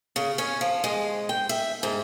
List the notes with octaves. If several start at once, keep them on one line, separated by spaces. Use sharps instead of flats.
C#3
C#4
F3
G#3
G5
E5
G#2